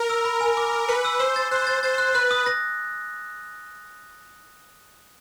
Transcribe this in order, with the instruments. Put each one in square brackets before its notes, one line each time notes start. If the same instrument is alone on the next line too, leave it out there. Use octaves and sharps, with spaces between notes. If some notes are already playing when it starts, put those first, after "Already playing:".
Already playing: [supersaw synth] A#4
[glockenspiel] E6
B5
G#5
D6
D6
[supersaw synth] B4 [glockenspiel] C#7
[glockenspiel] E6
[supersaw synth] C5 [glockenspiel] E6
[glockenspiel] A6
[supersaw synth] C5 [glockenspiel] F#6
[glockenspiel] A6
[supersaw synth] C5 [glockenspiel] A6
[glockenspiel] F#6
[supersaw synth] B4 [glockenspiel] F#6
[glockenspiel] D#6
A#6